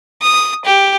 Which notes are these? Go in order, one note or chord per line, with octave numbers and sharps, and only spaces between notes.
D#6
G4